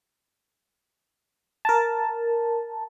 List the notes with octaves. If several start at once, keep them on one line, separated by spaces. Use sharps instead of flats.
A#4 A5